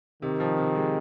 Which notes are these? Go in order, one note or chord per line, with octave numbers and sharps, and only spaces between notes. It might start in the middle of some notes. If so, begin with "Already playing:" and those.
C3 D#3
F3
C3
G#3